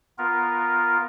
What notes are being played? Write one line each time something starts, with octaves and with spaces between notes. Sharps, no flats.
B3 F4 A#4